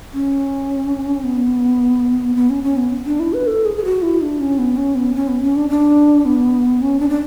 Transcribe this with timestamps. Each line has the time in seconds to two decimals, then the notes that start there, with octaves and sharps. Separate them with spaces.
0.13 C#4
1.24 B3
2.36 B3
2.50 C#4
2.64 C#4
2.77 B3
3.06 D4
3.20 E4
3.33 B4
3.47 A4
3.65 G#4
3.76 G#4
3.85 F#4
4.02 E4
4.21 D4
4.40 C#4
4.58 B3
4.77 C#4
4.95 B3
5.14 C#4
5.28 B3
5.42 C#4
5.56 D4
5.70 D4
6.25 B3
6.82 C#4
7.00 D4
7.10 D4